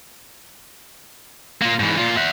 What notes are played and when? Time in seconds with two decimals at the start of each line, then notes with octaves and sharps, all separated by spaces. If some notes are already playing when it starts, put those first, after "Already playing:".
1.62 A#3 F4
1.80 G#2 E3
1.98 A#2 F4
2.17 E5 F#5